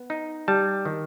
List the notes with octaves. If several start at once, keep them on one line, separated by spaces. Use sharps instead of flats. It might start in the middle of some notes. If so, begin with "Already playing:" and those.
Already playing: B3
D#4
G3 A5
D#3